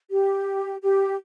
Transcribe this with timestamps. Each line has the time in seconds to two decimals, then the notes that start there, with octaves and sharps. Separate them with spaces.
0.11 G4
0.82 G4